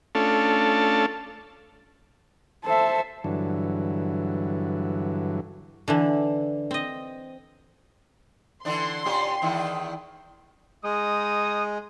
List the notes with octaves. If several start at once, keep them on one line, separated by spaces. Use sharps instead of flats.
A3 C#4 D4 F4 A4
A4 C5 E5
G2 D3 E3 F#3
D3 E3 D4
C4 D#5
D3 E3 D4 C6
A#2 C#4 G4
E2 D#3 E4
G#3 D#4 D#6